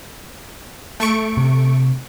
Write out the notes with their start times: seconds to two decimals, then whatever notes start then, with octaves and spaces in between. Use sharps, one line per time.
1.00 A3 C#6 D7
1.37 C3